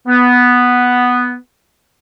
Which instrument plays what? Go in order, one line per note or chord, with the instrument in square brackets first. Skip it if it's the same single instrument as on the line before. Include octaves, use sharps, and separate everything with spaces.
[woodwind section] B3